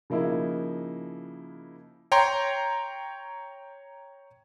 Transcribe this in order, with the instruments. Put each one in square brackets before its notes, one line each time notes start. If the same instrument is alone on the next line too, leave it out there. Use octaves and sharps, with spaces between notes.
[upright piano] C#3 F3 A#3 D#4 E4
[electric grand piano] C#5 G5 A#5 C6